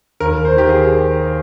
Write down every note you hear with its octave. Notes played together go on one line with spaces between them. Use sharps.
D#2 A#4
C5
D#3 G4
G#4